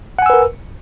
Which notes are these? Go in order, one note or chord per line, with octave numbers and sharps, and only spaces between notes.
A#4 B4 F#5 G#5 E6